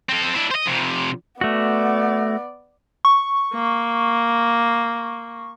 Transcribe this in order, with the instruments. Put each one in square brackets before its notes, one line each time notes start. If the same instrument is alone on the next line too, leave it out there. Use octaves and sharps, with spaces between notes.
[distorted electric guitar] C4 A4
D4 E4
C5 D#5
F2 C3
[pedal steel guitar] A3 F#4 [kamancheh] B3 D5
[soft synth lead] C#6
[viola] A#3